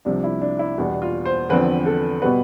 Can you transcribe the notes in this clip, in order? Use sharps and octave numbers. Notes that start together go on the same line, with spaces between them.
C2 C3 F3 D4
E4
D4
E4
E2 B2 G3 B3 D4
F4
C5
E2 D3 F3 C4 B4
A4
B2 G3 B3 B4